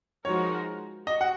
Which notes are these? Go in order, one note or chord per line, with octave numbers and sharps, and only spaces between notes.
F3 G#3 D#4 F#4 A#4 C#5
F#4 D#5
F#5